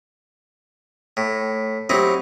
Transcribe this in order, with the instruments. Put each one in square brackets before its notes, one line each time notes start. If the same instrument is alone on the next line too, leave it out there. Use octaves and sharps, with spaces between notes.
[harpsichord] A2
[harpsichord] F#3 D#4 E4 [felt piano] C4 G4